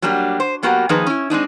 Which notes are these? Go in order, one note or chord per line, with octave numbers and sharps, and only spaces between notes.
F#3 G3 A#3 D4 G4
C5
F#3 A#3 B3 F#4 G4 A#4
D#3 F3 A#3 D#4 G#4 B4
C#4 E4
G#3 C4 D4 D#4